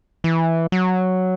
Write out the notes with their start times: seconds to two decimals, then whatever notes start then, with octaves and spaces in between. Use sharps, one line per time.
0.24 E3
0.72 F#3